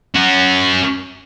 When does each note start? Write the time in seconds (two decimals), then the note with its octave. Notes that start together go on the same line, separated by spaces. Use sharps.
0.14 C#4 F#4